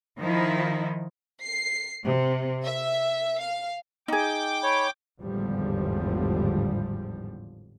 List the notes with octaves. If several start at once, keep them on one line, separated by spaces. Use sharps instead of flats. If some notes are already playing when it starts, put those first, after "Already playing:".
D#3 F3 D#4 E4
C7
C3
E5
F5
D#4 G#4 G5 D6
C#5 B5
G#1 E2 A2 D3 F3 G3